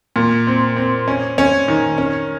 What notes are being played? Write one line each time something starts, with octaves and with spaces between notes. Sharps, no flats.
A#2
C4
C4
C#4
C#4
D#3
C#4